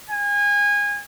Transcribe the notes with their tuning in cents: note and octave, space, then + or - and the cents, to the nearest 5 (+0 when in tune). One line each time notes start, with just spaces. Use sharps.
G#5 -25